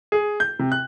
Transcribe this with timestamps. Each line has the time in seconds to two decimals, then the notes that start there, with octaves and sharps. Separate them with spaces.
0.12 G#4
0.40 G6
0.59 C3
0.72 F#6